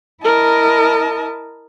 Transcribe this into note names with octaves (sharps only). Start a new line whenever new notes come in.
E4 A#4 D#5 A5